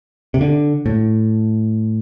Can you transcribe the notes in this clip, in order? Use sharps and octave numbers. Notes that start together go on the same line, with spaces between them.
C3
D3
A2